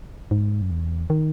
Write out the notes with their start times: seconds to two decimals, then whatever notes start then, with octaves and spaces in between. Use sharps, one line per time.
0.31 G#2
0.62 F#2
0.71 E2
1.10 D#3